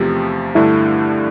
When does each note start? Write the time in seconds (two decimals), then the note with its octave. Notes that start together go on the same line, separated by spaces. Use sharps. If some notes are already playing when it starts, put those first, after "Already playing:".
Already playing: E2 C3 F3 A3 C4 G4
0.55 G2 D3 A3 D4 E4